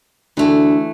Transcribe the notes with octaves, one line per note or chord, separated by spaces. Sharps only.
D2 E3 A3